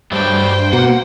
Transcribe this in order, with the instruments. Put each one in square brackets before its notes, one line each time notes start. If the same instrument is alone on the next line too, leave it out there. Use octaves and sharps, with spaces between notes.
[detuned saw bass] G2 [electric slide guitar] F#3 G3 A3 [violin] C5 G5
[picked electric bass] B2 [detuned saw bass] A#3 [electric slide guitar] F#5